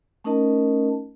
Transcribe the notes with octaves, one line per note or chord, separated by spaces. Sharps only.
A3 C#4 D#4 A#4 D#5 A5